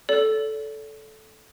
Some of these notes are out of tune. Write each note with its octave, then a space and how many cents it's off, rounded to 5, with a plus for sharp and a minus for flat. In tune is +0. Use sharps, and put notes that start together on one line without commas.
A4 -10 D5 -40